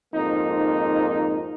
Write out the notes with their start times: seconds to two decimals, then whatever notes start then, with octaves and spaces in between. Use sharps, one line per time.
0.13 F2 G#2 A#3 D#4